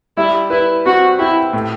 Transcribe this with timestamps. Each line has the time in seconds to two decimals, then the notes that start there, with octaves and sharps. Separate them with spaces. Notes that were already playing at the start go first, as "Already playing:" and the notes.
0.16 G3 E4
0.50 E4 B4
0.85 C4 F#4
1.19 E4 G4
1.53 A2